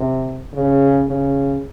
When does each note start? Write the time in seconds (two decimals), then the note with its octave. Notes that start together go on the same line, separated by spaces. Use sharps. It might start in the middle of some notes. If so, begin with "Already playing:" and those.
Already playing: C3
0.53 C#3
1.07 C#3